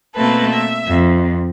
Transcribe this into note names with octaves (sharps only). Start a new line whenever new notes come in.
B2 A3 A#3 C4 A4 B4
E5
F2